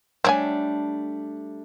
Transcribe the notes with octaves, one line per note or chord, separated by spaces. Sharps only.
G3 A3 C4 D4 C#5 G#5